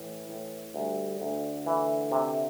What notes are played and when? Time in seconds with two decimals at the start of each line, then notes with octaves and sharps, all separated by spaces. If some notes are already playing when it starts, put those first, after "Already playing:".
Already playing: A2 E3
0.29 A2
0.74 D2 G3
1.20 D2 D3
1.66 E3
2.12 C3